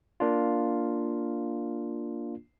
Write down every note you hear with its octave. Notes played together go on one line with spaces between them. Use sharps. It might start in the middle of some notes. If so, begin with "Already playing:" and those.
A#3 D4 F4